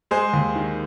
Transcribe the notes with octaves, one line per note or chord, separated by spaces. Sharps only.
G#3 G#4 C5
D#2
D#3